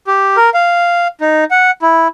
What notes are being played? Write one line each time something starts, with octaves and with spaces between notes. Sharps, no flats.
G4
A#4
F5
D#4
F#5
E4